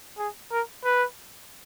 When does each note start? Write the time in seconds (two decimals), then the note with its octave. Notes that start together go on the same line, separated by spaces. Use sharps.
0.18 G#4
0.52 A#4
0.85 B4